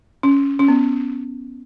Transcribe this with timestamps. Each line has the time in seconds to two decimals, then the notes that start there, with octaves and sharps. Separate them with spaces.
0.23 C#4
0.59 C#4
0.68 B3